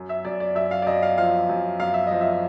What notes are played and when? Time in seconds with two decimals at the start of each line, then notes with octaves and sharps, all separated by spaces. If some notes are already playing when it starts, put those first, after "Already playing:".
Already playing: F#2
0.09 E5
0.25 F#2 D5
0.40 D5
0.55 F#2 E5
0.71 F5
0.82 D5
0.87 F#2 D#5
1.02 F5
1.18 F3 F5
1.49 F#2
1.80 F#2 F5
1.94 E5
2.07 F3 D#5
2.21 E5